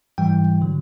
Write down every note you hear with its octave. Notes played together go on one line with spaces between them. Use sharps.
G#2 E3 G3 G5
D3 F#3